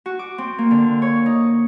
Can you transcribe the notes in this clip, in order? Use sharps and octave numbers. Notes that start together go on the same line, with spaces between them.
F#4
D6
C4
A#3
D3
C#5
D#4